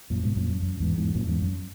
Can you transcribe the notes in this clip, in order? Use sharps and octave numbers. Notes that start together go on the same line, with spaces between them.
F#2 A#2
G#2 B2
F#2 A#2
F#2
F#2
E2 G#2
E2 G#2
F#2 A#2
E2 G#2
F#2